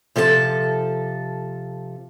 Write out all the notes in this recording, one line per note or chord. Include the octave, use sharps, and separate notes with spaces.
C3 F3 A4 B4 A5